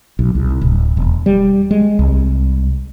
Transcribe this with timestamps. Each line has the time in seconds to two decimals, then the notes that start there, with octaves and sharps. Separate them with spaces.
0.19 B1
0.35 C2
0.61 D1
0.97 E1
1.26 G3
1.71 G#3
1.99 C2